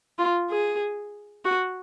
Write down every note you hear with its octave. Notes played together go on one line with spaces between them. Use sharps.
F4
G#4
F#4